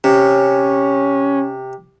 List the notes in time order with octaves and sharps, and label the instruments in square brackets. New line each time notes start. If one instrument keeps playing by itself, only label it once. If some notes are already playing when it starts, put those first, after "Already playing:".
[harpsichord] C3 [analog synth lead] C#4